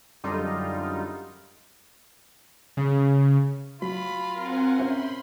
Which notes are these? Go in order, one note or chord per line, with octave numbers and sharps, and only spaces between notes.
F#2 D3 G3 D#4 F4
C#3
F#3 F4 B5
C4 A#4 F#5 G#5
C#4 C5 E5 B5 C6